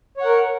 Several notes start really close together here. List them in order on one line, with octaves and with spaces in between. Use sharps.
C#5 F#5 A#4